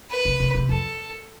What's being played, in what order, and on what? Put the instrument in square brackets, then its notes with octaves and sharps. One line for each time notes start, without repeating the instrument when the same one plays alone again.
[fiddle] B4
[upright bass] C3
C3
C3
[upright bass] F2 [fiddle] A4